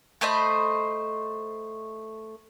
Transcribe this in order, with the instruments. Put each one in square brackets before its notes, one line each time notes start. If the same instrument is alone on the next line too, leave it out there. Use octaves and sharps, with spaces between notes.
[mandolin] A3 C5 D#5 B5